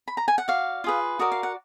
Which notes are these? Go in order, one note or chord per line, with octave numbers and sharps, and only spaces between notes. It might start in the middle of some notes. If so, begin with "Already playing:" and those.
B5
A#5
G#5
F#5
F#4 D5 F5
F4 G#4 B4
F#4 A#4 D5 D#5
F5
F#5